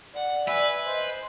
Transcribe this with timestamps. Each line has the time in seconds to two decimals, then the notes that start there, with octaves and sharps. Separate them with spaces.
0.14 D5 F#5
0.47 B4 E5 G#5
0.87 C5 D#5